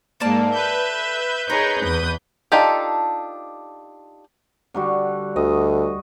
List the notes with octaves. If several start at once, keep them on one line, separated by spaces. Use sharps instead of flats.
G#2 A#3 A4 D5 A5
B4 E5 G6
D#4 G#4 A#4 C#5
E2 D#6
D4 D#4 F4 G4 A4
D3 G3 F#4
D2 D#5